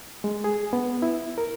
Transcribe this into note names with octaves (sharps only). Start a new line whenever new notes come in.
G#3
G#4
B3
E4
A#4